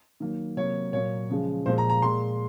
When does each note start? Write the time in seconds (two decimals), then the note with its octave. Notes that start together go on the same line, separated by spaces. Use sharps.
0.20 D#3 F#3 A#3
0.57 C3 F#3 A#3 C#5
0.93 A#2 F#3 A#3 C#5
1.30 C#3 F3 G#3
1.66 A#2 F3 G#3 C5
1.78 A#5
1.90 A#5
2.02 A#2 G#3 C6